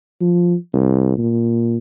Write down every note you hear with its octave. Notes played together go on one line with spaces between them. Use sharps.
F3
C2
A#2